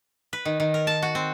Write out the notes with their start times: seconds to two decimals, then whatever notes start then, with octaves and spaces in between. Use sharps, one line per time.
0.33 B4
0.45 D#3
0.60 D#3
0.74 A#4
0.87 A5
1.02 F#4
1.15 C4